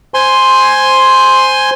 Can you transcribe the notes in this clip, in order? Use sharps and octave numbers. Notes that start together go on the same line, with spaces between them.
C5 G#5 C6